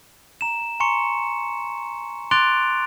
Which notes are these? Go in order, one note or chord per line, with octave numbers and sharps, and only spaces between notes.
A#5 E7
G#5 A#5 C6 C#6 C#7
C6 D6 F#6 A6 D7 F7